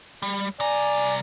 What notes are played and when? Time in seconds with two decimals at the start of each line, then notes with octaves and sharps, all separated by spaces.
0.22 G3
0.60 C2 D5 G#5 A#5